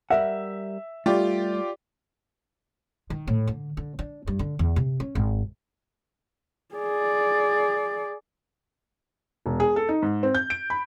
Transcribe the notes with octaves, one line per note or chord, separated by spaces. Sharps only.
G3 A#4 E5 F#5
G3 A3 F4 G4 D5
D#3
A2
D3
D3
D4
G2
D3
E2
C3
C#4
G#1
G#4 D5
E1
G#4
A4
D#4
G#2
C4
G6
D7
B5